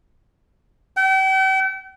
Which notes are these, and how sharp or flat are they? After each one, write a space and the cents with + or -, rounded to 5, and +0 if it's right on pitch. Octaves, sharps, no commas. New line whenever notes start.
G5 -40